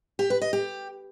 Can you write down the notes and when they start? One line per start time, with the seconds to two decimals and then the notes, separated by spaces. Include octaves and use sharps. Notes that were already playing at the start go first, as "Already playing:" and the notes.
0.19 G4
0.30 B4
0.42 D#5
0.53 G4